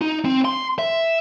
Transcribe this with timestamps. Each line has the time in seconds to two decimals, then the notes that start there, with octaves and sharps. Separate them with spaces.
0.01 D#4
0.25 C4
0.45 C6
0.79 E5